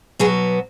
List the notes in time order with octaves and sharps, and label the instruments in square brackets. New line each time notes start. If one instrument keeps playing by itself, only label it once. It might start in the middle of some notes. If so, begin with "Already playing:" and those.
[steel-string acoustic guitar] B2 F#3 B3 G#4